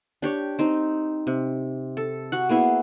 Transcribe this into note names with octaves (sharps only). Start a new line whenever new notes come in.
D4 G4 C#5
C4 D#4
C3
A4
F#4 F#5
A#3 B3 E4 G#4